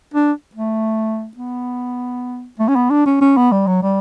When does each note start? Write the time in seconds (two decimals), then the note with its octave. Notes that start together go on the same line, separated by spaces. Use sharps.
0.14 D4
0.55 A3
1.37 B3
2.59 A3
2.68 C#4
2.76 B3
2.90 D4
3.06 C#4
3.21 C#4
3.37 B3
3.52 G3
3.67 F#3
3.83 G3